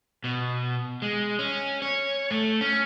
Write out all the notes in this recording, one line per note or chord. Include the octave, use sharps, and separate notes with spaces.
B2
G#3
C#4
C#5
A3
C#4